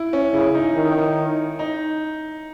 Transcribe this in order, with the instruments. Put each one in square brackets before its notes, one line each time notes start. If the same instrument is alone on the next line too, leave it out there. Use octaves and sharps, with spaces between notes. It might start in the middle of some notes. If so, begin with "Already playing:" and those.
Already playing: [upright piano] E4
C#4
[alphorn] C#3 [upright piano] E4
[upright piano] D#4
[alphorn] D#3
[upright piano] D#4